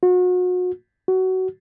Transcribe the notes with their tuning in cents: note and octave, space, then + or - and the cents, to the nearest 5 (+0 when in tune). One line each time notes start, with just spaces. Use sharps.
F#4 -35
F#4 +20